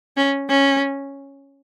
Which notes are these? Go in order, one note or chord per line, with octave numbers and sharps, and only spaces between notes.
C#4
C#4